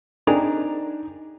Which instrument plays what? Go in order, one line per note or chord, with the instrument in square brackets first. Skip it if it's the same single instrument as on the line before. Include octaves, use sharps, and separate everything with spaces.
[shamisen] C4 G#4 A#4 [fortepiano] D4 [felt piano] D#4